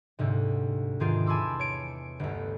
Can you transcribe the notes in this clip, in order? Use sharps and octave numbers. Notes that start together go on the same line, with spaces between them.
D2 G#2 C3
E2 G#2 D#3 F4 G#4 G5
G#5 A5 B5 C6 D6 E6
C#5 D7
G1 D2